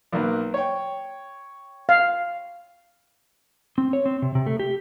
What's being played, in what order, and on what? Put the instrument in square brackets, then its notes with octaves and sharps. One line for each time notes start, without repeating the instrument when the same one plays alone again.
[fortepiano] B1 A#3 B4
C#5 G5
[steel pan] F5
[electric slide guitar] C4
C#5
C4
C3
C3
A3
G4